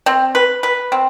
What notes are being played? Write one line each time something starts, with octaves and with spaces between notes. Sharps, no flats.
C4
B4
B4
C4